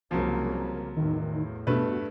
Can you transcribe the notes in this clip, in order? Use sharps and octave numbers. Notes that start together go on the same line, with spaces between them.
C2 C#3 F3 F#3 A#3
E2 A2 D#3
G2 B2 A3 B4